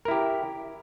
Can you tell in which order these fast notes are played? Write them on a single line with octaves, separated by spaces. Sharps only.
A#4 E4 G4